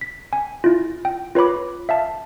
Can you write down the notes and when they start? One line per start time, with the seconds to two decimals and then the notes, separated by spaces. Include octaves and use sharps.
0.01 B6
0.33 G#5
0.64 E4 F4
1.05 G5
1.35 F4 B4 C#5 B5 D6
1.89 E5 F5 A5